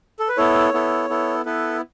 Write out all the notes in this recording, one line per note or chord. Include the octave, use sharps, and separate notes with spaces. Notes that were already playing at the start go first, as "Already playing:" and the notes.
A4
B4
B3 E4 A4 C#5
B3 E4 A4
B3 E4 A4
B3 E4 A4 B4